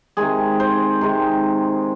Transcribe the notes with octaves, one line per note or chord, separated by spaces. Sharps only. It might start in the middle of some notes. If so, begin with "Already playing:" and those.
C3 D#3 G#3 G#4
C5
C3 D#3 G#3